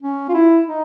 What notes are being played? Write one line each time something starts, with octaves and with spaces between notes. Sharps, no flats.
C#4
F4
E4
D#4